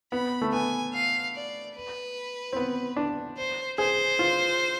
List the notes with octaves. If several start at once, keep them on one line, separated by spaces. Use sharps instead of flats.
B3 B5
A3
B3 G#5
F5
D5
B4
C4
B3
D4
C5
G#4 C5
F4